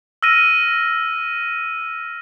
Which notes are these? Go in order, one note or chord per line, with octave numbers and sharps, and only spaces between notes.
E6 F6 A#6 D#7